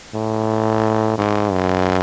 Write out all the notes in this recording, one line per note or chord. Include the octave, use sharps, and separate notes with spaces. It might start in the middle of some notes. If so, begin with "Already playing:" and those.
A2
G#2
F#2